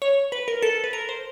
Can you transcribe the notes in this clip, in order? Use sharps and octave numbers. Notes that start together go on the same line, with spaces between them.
C#5
B4
A#4
A4
B4
A#4
C5